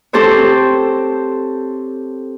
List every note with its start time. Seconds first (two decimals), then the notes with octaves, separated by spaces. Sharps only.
0.13 C4 G4 A4 C5 C#5